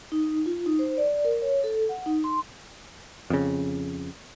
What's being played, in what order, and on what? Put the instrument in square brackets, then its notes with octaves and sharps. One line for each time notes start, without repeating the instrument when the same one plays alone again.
[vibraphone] D#4
F4
D#4
C5
D5
A#4
C#5
A4
F#5
D#4
C6
[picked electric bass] F2 C#3